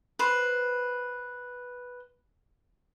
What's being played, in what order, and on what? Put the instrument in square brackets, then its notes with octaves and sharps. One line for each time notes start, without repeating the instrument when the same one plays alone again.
[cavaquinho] B4 C5